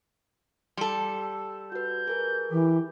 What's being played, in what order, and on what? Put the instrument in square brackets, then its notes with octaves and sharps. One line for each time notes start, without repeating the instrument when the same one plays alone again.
[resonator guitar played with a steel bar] G3 A4 [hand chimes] C6
[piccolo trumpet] E6
[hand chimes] F#4 B4 [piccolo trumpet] G6
[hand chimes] G#4 A#4 B4
[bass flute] E3 [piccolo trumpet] G4